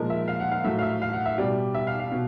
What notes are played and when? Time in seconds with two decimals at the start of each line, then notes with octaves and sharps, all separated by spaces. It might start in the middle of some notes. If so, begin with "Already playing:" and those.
Already playing: A#2 F3 G#3 A#4
0.10 E5
0.28 F5
0.40 F#5
0.52 F5
0.64 A2 F#3 A3 E5
0.79 F5
0.82 E5
1.02 F5
1.13 F#5
1.26 E5
1.38 B2 G3 D5
1.75 E5
1.87 F5
1.99 F5
2.12 B2